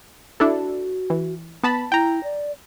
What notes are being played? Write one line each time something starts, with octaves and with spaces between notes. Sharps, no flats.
D4 E4 F#4 A4
E3
B3 A5 B5
E4 G5 A#5
D5